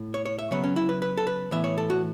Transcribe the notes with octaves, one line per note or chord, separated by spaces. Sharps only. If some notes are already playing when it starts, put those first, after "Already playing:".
Already playing: A2 A3
C#5
C#5
E5
C#3 F#3 B3 C#5
C#4
E4
B4
B4
A4
B4
A2 E3 B3 E5
C#5
A4
F#4